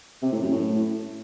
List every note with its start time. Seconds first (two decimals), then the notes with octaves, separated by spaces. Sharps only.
0.22 C3
0.32 A2
0.42 F#2
0.52 A2